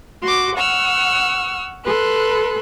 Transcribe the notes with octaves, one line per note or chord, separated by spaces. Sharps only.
F#4 C6 D6
F#5 C#6 E6 F6
A4 B4 C6 F#6